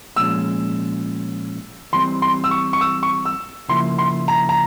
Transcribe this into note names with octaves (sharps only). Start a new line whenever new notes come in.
A#2 F3 G#3 C#4 E6
E3 G3 C4 C6
C6
E6
C#6
C#6
E6
C#6
E6
C#3 F3 A#3 E4 C6
C6
A#5
A#5